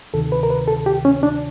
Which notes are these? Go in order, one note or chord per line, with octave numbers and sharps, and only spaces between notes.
D2 C3 D#3 A4
B4
A#4
B4
A4
G4
C#4
D4